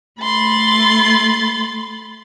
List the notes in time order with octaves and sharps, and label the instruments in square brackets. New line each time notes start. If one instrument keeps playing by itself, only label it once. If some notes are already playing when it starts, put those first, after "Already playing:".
[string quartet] A3 B5 C6 A6